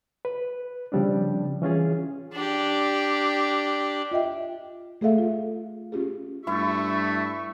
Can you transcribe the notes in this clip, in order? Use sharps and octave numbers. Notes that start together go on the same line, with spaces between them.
B4
C#3 F3 G3 C4 D4
E3 C#4 F4 G#4
D4 G4
F4 D#5 E5 G5
A3 G#4 A4 E5 F5
F4
C#4 F4 G4 G#4
G2 A3 E4 E5 C#6